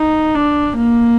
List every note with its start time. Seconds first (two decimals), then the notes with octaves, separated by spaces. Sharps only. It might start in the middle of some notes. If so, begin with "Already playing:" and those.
Already playing: D#4
0.35 D4
0.77 A#3